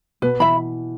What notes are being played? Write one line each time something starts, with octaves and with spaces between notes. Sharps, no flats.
B2 B4
E3 E5 B5